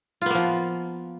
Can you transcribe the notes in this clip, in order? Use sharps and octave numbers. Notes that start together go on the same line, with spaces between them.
F3 A#3 B3 F4